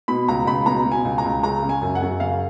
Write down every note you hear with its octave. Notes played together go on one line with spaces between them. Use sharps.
B2 B5
C#2 A#5
C#2 B5
B2 A#5
B2
G#5
C#2
A#5
C#2
C#3 A#5
C#3
G#5
F#2
F#5
F#2
C#3 F5